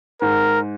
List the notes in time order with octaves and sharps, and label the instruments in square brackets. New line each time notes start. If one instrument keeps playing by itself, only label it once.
[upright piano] G#2 [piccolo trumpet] A#4